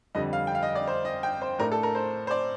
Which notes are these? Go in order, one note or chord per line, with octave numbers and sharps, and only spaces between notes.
F2 D3 G3 D#5
F5
G5
F5
D#5
D5
C5
D#5
G5
C5
A2 A3 D4 A#4
A4
A#4
C5
C5
D5